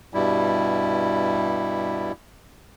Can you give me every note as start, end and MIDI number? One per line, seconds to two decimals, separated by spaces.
0.14 2.12 43
0.14 2.12 47
0.14 2.12 55
0.14 2.12 64